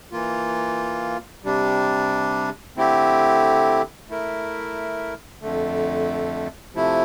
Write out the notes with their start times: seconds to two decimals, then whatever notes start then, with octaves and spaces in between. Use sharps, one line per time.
0.12 E3 A#3 F4
1.44 C3 G3 D4
2.77 D3 A3 C4 E4 G4
4.09 A3 E4 A#4
5.41 F2 D3 A3
6.74 C3 F3 A3 E4